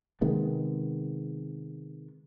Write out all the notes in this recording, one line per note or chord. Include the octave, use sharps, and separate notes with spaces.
C3 D#3 G#3 B3